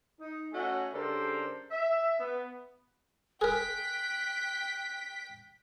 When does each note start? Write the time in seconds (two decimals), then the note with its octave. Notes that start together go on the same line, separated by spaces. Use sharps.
0.20 D#4
0.53 A3 C#4 F#4 D#5 F#5 G#5
0.93 C#3 G3 D4 A4 A#4 C5
1.71 E5
2.19 B3
3.41 G#4 A#4 G5 F#6 B6